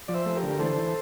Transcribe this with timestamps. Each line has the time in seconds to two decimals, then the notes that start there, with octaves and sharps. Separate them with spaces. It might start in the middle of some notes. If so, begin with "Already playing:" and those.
0.08 F3 D5
0.14 C5 E5
0.26 A3
0.36 G4 A#4
0.43 D3
0.59 E3 A4 C5
0.76 E3